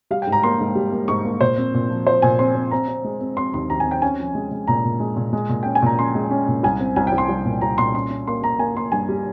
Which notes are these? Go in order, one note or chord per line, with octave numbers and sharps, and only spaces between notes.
G3 F5
G5
G#2
A#5
A#3 C6
G#2
G3
A#3
G#2 C#6
A#3
A#2 C5
C4
A#2
F3
F3 C5
A#2 G#5
C4 C6
C4
C4 A#5
C4
G#3
C4
C4 C6
D#2 C6
D#2 A#5
G#5
C4
G5
C#4 G#5
F3
G#3
G#3
A#2 A#5
A#2
G#3
A#2
G#3
A#2
C#4 G5
G#5
A#2 A#5
C#4 C6
G#3
C#4
A#2
C2 G#5
C4
C2 G#5
G5
C2
C6
C2
A#2
C2 A#5
A#2 C6
C#4 C6
C#4
A#3 C6
A#3 A#5
A#3 G#5
A#3 C6
G2 G#5
G3